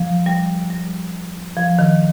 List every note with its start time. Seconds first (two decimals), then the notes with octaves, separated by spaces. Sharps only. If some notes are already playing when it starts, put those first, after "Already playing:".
Already playing: F3
0.26 G3
0.70 G3
1.57 F3
1.79 D#3